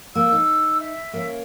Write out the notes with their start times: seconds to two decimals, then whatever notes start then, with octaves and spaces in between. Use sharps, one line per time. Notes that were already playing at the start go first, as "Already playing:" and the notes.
0.15 A#3 E6
0.32 D#4
0.80 E5
1.13 A#3 C#4